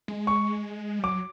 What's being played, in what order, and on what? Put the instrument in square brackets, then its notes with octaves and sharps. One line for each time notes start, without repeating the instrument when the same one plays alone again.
[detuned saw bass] G#3
[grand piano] C#6
[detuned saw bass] G3
[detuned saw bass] F#3 [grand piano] D6